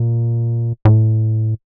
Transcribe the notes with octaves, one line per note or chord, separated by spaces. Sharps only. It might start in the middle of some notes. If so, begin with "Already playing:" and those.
Already playing: A#2
A2